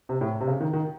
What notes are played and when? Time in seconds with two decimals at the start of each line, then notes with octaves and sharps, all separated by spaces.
0.09 C3
0.21 A2
0.41 C3
0.47 C#3
0.61 D#3
0.73 D#3